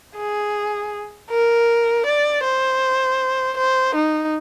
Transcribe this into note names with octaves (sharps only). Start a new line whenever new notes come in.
G#4
A#4
D5
C5
C5
D#4